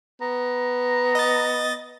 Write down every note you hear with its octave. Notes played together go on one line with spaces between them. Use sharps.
B3 A#5
D#5 A6